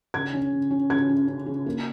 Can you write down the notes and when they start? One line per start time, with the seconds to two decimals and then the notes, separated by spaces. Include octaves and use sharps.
0.14 C#3 G#6
0.34 C#4
0.52 C#3
0.71 C#4
0.90 C#3 G#6
1.09 C#4
1.27 C#4
1.46 C#3
1.66 A#3